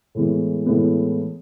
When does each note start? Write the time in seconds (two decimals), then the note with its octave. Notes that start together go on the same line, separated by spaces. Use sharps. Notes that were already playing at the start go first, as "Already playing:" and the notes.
0.15 A2 E3 G#3 B3
0.66 A2 E3 G#3 B3